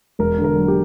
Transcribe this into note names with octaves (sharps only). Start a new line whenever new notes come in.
E1 A#4
D3
A#4
F#3
G4